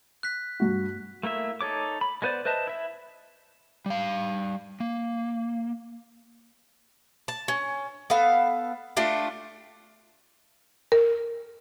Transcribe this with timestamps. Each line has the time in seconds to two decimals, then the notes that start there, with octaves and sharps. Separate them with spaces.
0.23 F#6 B6
0.60 G2 F#4
1.23 A3 A#3 E4 E5
1.61 D#4 A4 C#5 D6
2.01 B5
2.22 G#3 B3 B4 C5 D5
2.45 B4 C5 D#5 E5 A5
2.67 E4 E5
3.86 G3 F5
4.80 A#3
7.28 A5
7.48 C#4
8.10 B3 A4 F5
8.97 A3 D4 F4 G5
10.92 A#4